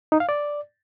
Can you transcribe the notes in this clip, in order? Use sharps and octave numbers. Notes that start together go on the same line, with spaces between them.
D#4
F5
D5